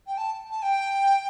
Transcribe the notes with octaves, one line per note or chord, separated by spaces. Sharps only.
G5
A5
A5
G5